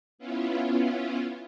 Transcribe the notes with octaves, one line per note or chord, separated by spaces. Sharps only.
B3 C#4 E4 F4